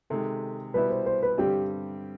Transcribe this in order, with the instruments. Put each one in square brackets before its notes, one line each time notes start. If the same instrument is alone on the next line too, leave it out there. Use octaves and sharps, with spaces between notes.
[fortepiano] C3 D#3 G#3 [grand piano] A4
[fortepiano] B2 G3 B3 E4 [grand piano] B4
[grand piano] C5
C5
B4
[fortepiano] G2 D3 G3 C4 [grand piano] G4